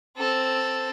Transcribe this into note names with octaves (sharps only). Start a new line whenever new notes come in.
C4 A4